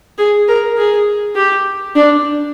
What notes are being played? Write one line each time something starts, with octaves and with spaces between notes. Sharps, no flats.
G#4
A#4
G#4
G4
D4